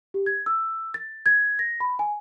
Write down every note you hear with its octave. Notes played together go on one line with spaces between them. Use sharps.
G4
G#6
E6
A6
G#6
A#6
B5
G#5